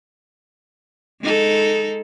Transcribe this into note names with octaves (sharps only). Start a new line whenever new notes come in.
G#3 D#4 A4